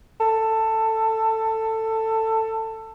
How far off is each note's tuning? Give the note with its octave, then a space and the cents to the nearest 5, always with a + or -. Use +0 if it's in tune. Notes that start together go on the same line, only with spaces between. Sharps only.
A4 +15